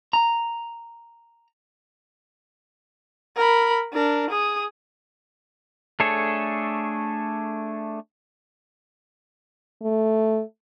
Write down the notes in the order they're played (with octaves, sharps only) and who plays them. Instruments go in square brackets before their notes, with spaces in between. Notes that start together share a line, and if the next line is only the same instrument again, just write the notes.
[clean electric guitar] A#5
[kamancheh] A#4 B5
D4 A#4
G#4 D#6
[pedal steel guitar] A3 D4 G#4 A4 C#5
[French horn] A3